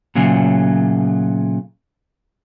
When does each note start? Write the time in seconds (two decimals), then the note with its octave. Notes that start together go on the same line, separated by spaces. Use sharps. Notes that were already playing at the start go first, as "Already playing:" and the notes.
0.15 A#2 C#3 F#3 A3